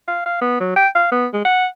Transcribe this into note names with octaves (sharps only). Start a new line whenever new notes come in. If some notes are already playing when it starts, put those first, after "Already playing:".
F5
F5
B3
F#3
G5
F5
B3
G#3
F#5